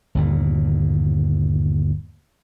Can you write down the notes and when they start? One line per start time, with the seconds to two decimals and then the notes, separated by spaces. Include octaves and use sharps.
0.15 G1 D#2 A#2